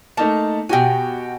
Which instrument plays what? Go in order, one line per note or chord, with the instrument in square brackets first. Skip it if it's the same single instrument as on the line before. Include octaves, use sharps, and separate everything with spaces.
[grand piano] A3 D#4 A5 [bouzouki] A#3
[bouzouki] B2 G#5 [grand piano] F#4 G4 G5